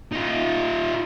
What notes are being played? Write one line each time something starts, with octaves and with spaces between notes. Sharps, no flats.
D#4 F4